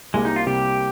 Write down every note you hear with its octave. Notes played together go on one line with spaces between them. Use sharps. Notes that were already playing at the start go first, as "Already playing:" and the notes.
C2 C3 G3 G#3 A#3
D#4
F4
C2 C3 G3 A#3 G4